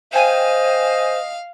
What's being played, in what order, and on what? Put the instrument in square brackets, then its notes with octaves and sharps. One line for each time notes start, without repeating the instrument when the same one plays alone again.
[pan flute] C5 [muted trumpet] D#5 [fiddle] F5 [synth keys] G5 G#5 D#7